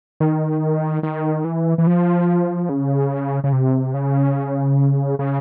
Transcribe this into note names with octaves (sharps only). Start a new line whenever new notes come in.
D#3
D#3
E3
E3
F3
C#3
C#3
C3
C#3
C#3